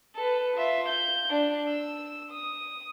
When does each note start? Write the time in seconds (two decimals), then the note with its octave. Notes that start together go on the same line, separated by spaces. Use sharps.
0.15 A4 B4
0.57 F4 E5
0.89 G6
1.30 D4
1.69 E6
2.31 D#6